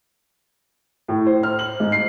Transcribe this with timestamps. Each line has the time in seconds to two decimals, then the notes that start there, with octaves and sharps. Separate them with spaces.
1.08 A2
1.26 C5
1.43 F6
1.59 F#7
1.80 G#2
1.92 C7